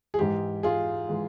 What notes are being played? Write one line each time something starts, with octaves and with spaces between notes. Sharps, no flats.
G#4
G#2 E3 G#3 G4
F4 G#4
E3 G#3